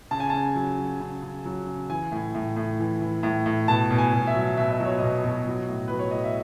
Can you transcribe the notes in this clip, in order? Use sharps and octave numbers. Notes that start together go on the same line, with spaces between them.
C#3 A5
G#5
C#3 A5
F#3
F#3
C#3
C#3
F#3
C#3
E3 G#5
A2
A2
A2
E3
E3
A2
A2
B2 A5
B2
G#5
B2
E5
F#3
B2 E5
D#5
F#3 C#5
B2 D#5
B2
F#3
A2
F#3 B4
C#5
A2 D#5
E5